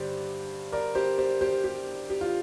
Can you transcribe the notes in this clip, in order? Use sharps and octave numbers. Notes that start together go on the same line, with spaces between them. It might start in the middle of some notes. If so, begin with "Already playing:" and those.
Already playing: G2 D3 G4 C5 D5
A#4 D5
G4 C5
G4 C5
G4 C5
G4
G4
F4